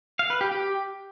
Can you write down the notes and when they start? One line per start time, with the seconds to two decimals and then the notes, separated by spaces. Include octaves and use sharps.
0.19 F5
0.30 B4
0.41 G4
0.51 G4